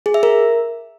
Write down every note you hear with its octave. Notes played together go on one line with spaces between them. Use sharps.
G#4
E5
A#4